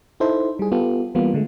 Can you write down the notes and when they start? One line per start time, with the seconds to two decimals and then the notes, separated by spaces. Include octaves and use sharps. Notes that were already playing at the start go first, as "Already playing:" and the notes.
0.20 D#4 E4 A4 C5
0.59 G3 G#4
0.72 B3 F4 G4 A4
1.15 E3 G3 A#3 B3 F4
1.34 D3 G#3 A3